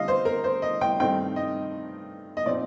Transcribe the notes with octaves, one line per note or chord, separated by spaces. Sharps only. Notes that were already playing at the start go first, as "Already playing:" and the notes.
Already playing: D3 G3 D#5 F5
C5
A#4
C5
D#5
G5
G2 D#3 A3 C4 D#4 G5
D#5
D#5
A#2 F3 C4 D#4 D5